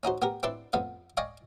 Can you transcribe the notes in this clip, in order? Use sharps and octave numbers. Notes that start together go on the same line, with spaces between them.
C#4 D#4 F#4 C5
B3 G4 A#4
C4 D4 E4 B4 D5 C6
F2 F3 B3 F5
D5 D#5 F5 G5 G#5 C#6